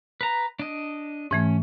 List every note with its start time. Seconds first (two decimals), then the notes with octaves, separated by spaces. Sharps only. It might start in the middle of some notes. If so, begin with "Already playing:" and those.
0.21 B4 A#5
0.59 D4 D#5
1.31 G#2 E3 A3 C#4